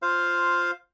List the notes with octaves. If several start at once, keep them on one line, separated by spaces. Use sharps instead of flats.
F4 C5 F5